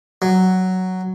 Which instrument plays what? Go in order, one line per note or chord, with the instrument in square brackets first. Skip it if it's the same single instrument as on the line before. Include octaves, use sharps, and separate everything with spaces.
[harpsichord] F#3